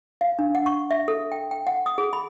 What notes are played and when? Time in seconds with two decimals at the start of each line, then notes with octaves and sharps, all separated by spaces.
0.21 F5
0.39 D4
0.55 F#5
0.66 C#6
0.91 E5
1.08 A4
1.32 G5
1.51 G5
1.67 F#5
1.86 D#6
1.98 G#4
2.13 B5